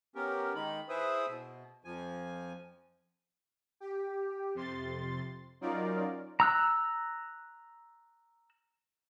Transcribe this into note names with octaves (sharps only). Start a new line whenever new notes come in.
B3 C#4 G4 A#4
D#3 G#3 D#4 B5
E4 G#4 B4 C5 E5 D#6
B2
F2 F3 G#5
G4
F2 C3 C6 A6
F#3 C#4 D#4 F4 A#4 D5
A#5 E6 F#6